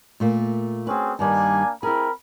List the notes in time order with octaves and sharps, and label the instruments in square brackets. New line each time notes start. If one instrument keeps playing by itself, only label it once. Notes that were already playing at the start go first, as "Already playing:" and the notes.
[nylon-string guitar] A#2 A3 A#3
[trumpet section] C4 C#4 G#4 [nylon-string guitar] F#4 B4
[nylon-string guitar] G2 D#3 G3 [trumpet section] A#3 D4 G#5
[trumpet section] C4 A#4 B5 [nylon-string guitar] E4 G#4